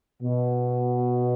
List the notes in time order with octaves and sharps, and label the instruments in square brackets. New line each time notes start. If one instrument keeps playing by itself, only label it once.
[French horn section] B2